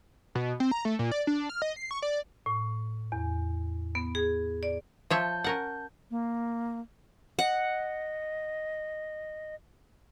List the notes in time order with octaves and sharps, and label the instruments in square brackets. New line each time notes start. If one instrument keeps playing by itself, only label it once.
[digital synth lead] B2
C4
A#5
A3
A#2
D5
D4
F6
D#5
C7
C#6
D5
[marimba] A2
E2
B3
G#4
D5
[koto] F3 C#5 E5 [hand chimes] A5 G6
[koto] C#4 A#4 F#5
[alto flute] A#3
[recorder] D#5 [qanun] F#5